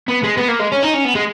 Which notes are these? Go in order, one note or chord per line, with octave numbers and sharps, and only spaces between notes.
B3
G#3
B3
A#3
G#3
C#4
D#4
C#4
B3
G#3